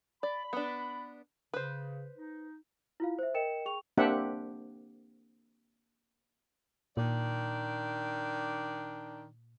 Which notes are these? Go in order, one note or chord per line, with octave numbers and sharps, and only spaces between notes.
D5 B5
B3 D4
C#3 B4 C5
D#4
E4 F4 F5
C5 E5
A#4 D#5 G5 C#7 E7
G#4 G5 C#6 F7
A#3 C4 D4 G4 E5 F#5
A#2 D#3 D4 D5